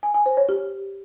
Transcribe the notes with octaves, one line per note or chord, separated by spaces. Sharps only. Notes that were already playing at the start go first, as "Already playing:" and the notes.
G#5
G#5
C5
C#5
G4